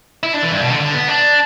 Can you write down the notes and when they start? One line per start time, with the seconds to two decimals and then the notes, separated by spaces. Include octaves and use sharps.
0.23 E4
0.33 D4
0.42 E3
0.51 G2
0.60 B2
0.70 D3
0.80 D3
0.94 B3
1.08 D4